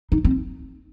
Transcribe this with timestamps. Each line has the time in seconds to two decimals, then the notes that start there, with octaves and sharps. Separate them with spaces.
0.12 D#4
0.24 C4